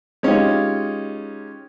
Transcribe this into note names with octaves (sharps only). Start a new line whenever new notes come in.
G#3 C#4 D#4 F4 G4